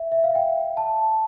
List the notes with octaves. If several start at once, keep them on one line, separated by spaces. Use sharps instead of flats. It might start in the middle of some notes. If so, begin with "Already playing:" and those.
Already playing: E5
E5
F5
G5
A5